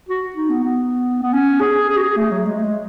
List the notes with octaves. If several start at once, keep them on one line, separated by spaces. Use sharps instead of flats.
F#4
D#4
B3
B3
B3
C#4
G#4
G#4
F#4
G#4
A3
F#3
G#3
A3
G#3